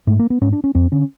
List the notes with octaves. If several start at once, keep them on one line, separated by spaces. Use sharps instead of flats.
G#2 A3
A#3
B3
G#2 C#4
D4
C#4
F2 C4
D3 C#4